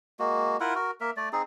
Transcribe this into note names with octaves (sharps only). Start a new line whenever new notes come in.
G#3 A#3 F#4
E4 F4 A#4 F#5
F#4 A#4
A#3 A#4 E5
A3 D5
C4 D#4 G#4